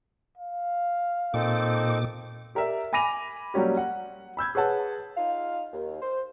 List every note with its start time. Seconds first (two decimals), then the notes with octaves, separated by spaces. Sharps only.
0.37 F5
1.34 A#2 C4 D#4 A4 D6
2.55 G4 A#4 D5 E5
2.93 G#5 B5 D6 A#6 D#7 F7
3.54 F#3 G3 A#3 C#4 G4
3.77 F#5
4.37 B5 E6 G6 G#6
4.55 G#4 B4 C#5 F#5 A5
5.17 D#4 F4 F5
5.73 D#2
6.02 C5